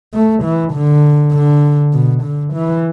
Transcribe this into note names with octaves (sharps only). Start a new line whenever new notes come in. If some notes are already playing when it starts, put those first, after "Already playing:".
A3
E3
D3
D3
B2
D3
E3